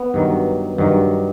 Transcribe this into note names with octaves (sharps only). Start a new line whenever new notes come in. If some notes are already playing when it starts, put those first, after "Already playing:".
Already playing: B3
G2 D#3 F#3
G2 D#3 F#3